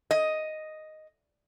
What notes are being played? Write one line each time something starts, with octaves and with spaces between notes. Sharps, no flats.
D#5